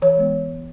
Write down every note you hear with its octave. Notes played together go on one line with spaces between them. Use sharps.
E3 C#5
G#3 B3